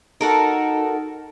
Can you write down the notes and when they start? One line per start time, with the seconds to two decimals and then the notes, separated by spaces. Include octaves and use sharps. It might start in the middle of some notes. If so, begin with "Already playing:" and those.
0.21 D#4 F#4 A4 A#4